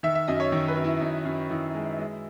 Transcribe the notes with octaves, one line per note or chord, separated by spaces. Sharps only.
D#3 E5
E5
F#2 D#5
C#5
D#3
B4
F#2
E4
F#2 D#4
F#2
D#3 E4
G#3
G#3